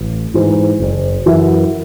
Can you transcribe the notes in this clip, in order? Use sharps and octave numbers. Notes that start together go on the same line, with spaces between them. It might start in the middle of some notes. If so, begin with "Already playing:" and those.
Already playing: A1
G#2 E3
F#1
F#2 E3